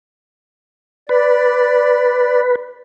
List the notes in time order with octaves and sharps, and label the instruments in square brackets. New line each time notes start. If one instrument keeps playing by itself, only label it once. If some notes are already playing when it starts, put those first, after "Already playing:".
[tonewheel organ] B4 [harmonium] D5